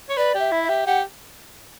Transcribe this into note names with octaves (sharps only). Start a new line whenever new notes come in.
C#5
B4 D5
G4
E5
E4
E5
G4
G4 F#5